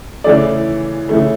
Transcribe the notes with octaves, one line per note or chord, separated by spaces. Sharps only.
C#3 E3 A3 D5
C#3 E3 A3